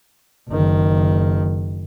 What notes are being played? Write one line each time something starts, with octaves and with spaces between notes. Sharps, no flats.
F#1 D#3